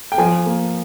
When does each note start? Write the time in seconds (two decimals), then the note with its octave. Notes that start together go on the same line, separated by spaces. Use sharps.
0.12 G5
0.18 F3 G#5
0.46 A#3